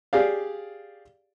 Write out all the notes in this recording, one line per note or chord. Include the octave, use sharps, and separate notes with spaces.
G4 G#4 D5 F5